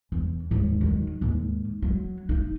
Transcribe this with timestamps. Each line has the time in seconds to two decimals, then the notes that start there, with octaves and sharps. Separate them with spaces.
0.12 E2
0.51 D#2 G#2
0.81 D#3 F#3
1.21 D#2 G#2
1.82 F#3
2.29 D#4